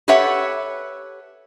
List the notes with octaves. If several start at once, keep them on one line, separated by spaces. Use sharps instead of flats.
G4 A4 B4 C#5 E5 F#5